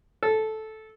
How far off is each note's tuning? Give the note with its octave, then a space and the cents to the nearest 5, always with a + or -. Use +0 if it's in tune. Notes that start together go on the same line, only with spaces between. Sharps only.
A4 -10